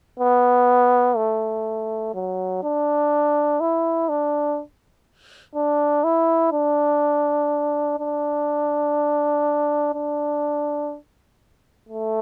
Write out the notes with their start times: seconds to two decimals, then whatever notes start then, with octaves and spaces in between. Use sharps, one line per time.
0.19 B3
1.16 A3
2.14 F#3
2.63 D4
3.60 E4
4.09 D4
5.55 D4
6.04 E4
6.52 D4
7.99 D4
9.94 D4
11.89 A3